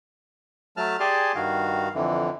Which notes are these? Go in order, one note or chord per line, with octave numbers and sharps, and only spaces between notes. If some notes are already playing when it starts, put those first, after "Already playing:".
F#3 A3 A5 F6
G4 G#4 D5 G#5 A5 C6
G2 D#3 F#4 F5
F2 D3 E3